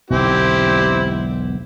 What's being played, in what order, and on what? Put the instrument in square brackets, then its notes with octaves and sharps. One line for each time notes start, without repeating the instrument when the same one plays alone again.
[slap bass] E1 B1 D3 [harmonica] C4 E4 G4